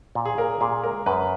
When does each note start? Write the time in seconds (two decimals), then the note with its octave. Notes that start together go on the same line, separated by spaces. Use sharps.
0.15 A#2
0.25 G#4
0.38 A#2 A#4
0.61 A#2 G#4
0.83 G#3 A#4
1.06 F#2 B4